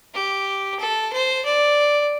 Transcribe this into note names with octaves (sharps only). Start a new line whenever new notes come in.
G4
A4
C5
D5